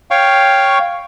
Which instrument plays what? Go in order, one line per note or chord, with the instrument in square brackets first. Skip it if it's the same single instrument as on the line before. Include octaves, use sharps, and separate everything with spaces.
[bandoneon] C#5 F5 G5 C#6